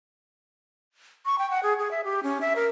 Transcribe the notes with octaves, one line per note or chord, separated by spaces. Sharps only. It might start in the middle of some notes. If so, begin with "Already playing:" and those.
C#6
G5
F#5
G#4
G#4
E5
G4
C#4
E5
A#4